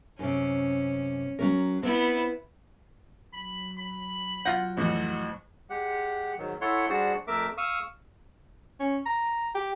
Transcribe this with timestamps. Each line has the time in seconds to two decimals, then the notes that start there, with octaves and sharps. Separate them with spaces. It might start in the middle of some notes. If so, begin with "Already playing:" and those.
0.19 F#2 C3 C#4
1.39 F#3 C#4 A#4
1.83 B3 C4 E4
3.33 F#3 B5
3.78 B5
4.45 F#3 F4 F#5 G6 A#6
4.77 F2 A2 E3 F#4
5.70 G#3 G4 F#5
6.38 G#2 D#3 F#3
6.61 E4 A4 C#5 F#5 C6
6.89 G3 D4 F#4 G#4 C5 F#5
7.27 F2 A3 A#4 E5 D6
7.57 F5 C#6 D#6 E6
8.80 C#4
9.06 A#5
9.55 G4